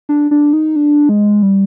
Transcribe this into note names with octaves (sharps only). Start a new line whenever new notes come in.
D4
D4
D#4
D4
G#3
G3